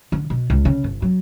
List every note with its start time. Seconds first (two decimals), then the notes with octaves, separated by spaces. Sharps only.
0.12 D3
0.30 B2
0.50 C#2
0.65 C#3
0.84 G1
1.02 F#3